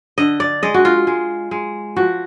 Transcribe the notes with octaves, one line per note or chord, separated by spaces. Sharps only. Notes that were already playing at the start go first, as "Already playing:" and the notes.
D3 D#5
D5
G#3 D#5
F#4
F4
G#3
G#3
F3 F#4